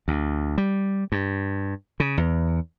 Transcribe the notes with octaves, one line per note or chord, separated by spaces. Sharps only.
D2
G3
G2
C#3
E2